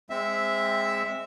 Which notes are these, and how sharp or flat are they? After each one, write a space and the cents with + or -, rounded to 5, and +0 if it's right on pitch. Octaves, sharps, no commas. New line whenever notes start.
G#3 -20 C4 +0 E5 +0